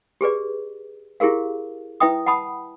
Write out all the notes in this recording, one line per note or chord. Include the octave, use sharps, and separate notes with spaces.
G4 G#4 B4 D5
E4 G4 G#4 A#4 F5
E4 B4 E5 G5 D#6
F#5 A5 B5 D#6